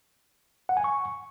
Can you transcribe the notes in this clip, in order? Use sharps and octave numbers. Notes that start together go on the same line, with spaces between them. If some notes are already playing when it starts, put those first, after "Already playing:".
F#5
G#5
C#6